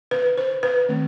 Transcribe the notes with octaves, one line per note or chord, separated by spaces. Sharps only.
B4
C5
B4
D#3 A3 C4